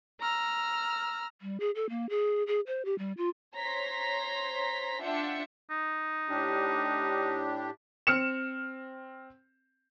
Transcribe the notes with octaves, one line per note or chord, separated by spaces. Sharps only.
A#5 E6 F6
G3
G#4
A4
A#3
G#4
G#4
C5
G4
G3
F4
C5 C#5 A#5 C6 A#6 B6
D4 F4 E5 F#5 G5 C#7
D#4
A2 D4 G4
C4 F6 C#7 E7